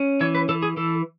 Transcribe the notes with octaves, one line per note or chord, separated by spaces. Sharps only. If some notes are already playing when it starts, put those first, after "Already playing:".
Already playing: C#4
E3 C#5
B4
E3 A4
G#4
E3 A4